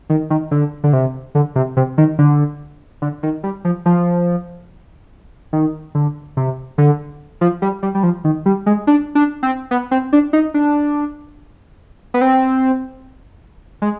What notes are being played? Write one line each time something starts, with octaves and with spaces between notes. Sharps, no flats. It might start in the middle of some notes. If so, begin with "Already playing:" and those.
D#3
D#3
D3
D3
C3
D3
C3
C3
D#3
D3
D3
D#3
G3
F3
F3
D#3
D3
C3
D3
F3
G3
G3
G3
F3
D#3
G3
G#3
D4
D4
C4
B3
C4
D4
D#4
D4
B3
C4
G#3